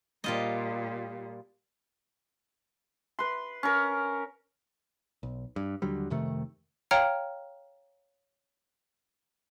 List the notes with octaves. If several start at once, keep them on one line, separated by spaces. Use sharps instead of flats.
A#2 G3 F4 D#5
B4 C6
C#4 A#4
B1
G2
D#2 D3 F#3 G3
F2 C3 D#3 A3
C#5 F5 G5 A#5 F6 C#7